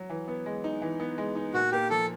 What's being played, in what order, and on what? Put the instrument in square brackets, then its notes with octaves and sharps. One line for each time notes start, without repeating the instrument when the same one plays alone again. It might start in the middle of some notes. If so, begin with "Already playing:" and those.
Already playing: [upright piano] F#3
E3
B3
G#3
D#4
E3
B3
G#3
D#4
[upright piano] A#2 [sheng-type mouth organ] F#4
[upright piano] A#3 [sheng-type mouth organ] G4
[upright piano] F3 [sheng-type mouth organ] A4